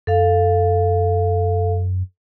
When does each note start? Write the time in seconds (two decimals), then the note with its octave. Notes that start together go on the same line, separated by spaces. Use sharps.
0.07 F#2 A4 F5